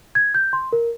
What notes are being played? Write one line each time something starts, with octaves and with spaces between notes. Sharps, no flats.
G#6
G6
C6
A#4